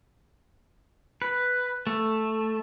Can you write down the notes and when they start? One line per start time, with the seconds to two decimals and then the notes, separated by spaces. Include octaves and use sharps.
1.22 B4
1.87 A3